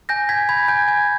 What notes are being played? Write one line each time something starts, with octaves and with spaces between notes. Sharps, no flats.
G#5 G6 A#6
G#5 G#6 B6
B5 G#6
G#5 G6
G#5 G#6